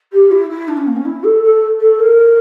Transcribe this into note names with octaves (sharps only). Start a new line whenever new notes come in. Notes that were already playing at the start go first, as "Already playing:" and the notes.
G4
E4
E4
D4
C#4
A#3
C#4
E4
A4
A4
A4
A#4